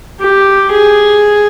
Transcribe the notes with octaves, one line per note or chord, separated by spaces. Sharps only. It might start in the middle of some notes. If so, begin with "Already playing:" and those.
G4
G#4